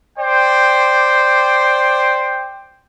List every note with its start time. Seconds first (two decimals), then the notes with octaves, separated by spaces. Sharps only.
0.17 C5 D5 G5